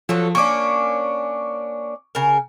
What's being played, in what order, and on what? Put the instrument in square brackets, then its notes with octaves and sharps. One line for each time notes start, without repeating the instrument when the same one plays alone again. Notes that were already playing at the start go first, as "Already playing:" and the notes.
[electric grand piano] F3 [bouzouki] F#3 A4
[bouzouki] A#3 C#4 D4 [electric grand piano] C#6 D6
[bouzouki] C#3 A#4